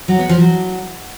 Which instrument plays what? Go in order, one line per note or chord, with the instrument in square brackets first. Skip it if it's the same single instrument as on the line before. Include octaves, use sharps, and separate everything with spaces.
[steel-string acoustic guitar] F#3
B3
F3
F#3